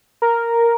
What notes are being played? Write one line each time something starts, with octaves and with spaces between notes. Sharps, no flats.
A#4